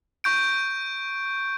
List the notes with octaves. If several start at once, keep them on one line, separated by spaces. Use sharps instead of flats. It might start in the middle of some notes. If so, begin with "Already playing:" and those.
C#6 G6 D7